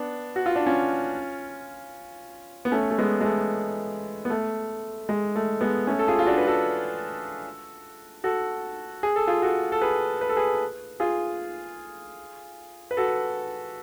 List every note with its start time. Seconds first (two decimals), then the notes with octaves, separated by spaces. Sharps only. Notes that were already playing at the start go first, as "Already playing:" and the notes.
Already playing: B3 D4
0.36 F#4
0.46 F4
0.56 D4
0.66 C#4 F4
2.65 B3
2.72 A3 C#4
2.91 A3
2.98 G#3 B3
3.21 G#3
3.24 A3
4.25 B3
4.30 A3
5.09 G#3
5.36 A3
5.61 G#3 B3
5.87 A3 C#4
5.99 A4
6.08 F4 G#4
6.19 F4
6.26 D4 F#4
6.38 B4
6.47 F#4 A4
8.24 F#4 A4
9.03 G#4
9.16 A4
9.27 F4 G#4
9.42 F#4 A4
9.72 A4
9.82 G#4 B4
10.21 B4
10.29 A4
10.37 G#4 B4
11.00 F4 G#4
12.91 B4
12.97 F#4 A4